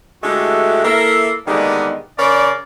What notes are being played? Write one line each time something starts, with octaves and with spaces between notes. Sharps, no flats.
D3 G#3 A3 E4 F#4 G4
A#3 E4 A4 A#4 E5
D3 D#3 G3 G#3 A#3 B3
C#3 A#4 C#5 D5